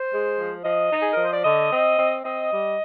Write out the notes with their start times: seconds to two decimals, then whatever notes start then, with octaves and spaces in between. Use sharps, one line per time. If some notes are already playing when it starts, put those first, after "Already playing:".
Already playing: C5
0.12 G#3
0.38 F3
0.64 F3 D#5
0.92 D#4
1.01 G#4
1.12 A#4
1.17 F3
1.23 C5
1.33 D5
1.44 D3 D#5
1.71 C4
1.98 C4
2.25 C4 D#5
2.51 G3